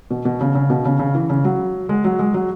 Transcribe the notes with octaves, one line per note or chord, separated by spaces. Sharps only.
B2
B2
C#3
C#3
B2
C#3
C#3
E3
C#3
F#3
G#3
F#3
G#3
F#3